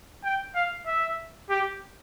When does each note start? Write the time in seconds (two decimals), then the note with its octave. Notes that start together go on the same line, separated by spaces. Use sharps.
0.24 G5
0.55 F5
0.87 E5
1.50 G4